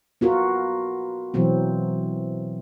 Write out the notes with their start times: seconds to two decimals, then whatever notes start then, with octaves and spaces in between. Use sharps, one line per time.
0.21 B3 F4 F#4 A#4
1.34 B2 E3 F#3 C4